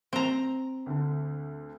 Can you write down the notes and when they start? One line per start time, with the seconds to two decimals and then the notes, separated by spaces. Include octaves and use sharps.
0.13 C4 A#5
0.86 D2 D3